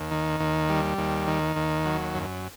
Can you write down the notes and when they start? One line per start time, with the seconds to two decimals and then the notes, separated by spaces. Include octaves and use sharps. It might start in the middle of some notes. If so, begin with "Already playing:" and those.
Already playing: D#2
0.11 D#3
0.40 D#2
0.69 G3
0.98 D#2
1.27 D#3
1.56 D#2
1.85 F#3
2.15 F#2